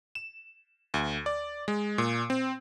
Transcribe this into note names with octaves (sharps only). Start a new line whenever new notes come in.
E7
D2
D5
G#3
A#2
C4